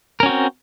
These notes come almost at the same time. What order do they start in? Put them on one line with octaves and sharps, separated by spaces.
A#4 C#4 F#4 C4